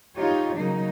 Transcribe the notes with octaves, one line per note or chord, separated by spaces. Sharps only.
D#4 F4 G4 C#5
C#3 F#3 A#3 D#4